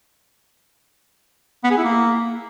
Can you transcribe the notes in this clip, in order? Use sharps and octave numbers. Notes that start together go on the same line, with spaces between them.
B3
G#4
E4
A#3